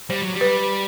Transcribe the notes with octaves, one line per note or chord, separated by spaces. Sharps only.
G3 C5
F#3
G3
B4